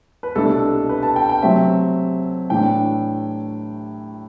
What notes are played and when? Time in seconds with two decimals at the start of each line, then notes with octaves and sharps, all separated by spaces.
0.23 B4
0.35 C2 B2 A3 D4 A4
0.89 B4
1.03 A5
1.16 G5
1.29 G5
1.42 C3 F#3 A3 C4 E5
2.50 A2 E3 A3 D4 G5